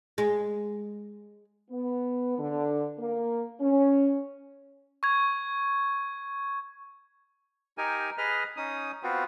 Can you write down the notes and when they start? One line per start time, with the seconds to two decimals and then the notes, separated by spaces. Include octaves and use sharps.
0.18 G#3
1.71 B3
2.39 D3
2.99 A#3
3.61 C#4
5.03 C#6 G#6
7.78 D#4 G4 A#4 G#5
8.18 G#4 B4 D#5 F6
8.57 C#4 D#4 D#6
9.03 B3 C4 F4 F#4